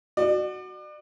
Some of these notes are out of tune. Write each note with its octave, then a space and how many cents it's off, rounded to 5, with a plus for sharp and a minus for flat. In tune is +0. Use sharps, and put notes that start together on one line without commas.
F#4 +0 D5 +35